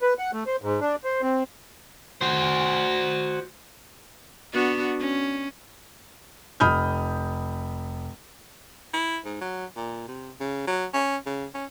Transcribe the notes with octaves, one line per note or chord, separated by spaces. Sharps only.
B4
F#5
A3
C5
G#2
D4
C5
C4
F#4 C5
B3 D4 F#4
C#4
F1 B5 D#6 F6 G6
E4
G#2
F#3
A#2
C3
C#3
F#3
C#4
C#3
C#4